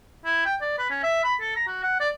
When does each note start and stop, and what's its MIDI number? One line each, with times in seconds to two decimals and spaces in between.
0.25 0.43 64
0.45 0.55 79
0.61 0.78 74
0.78 0.86 71
0.90 1.01 61
1.03 1.23 76
1.24 1.35 83
1.40 1.54 69
1.56 1.67 82
1.67 1.78 66
1.83 1.96 78
2.00 2.09 74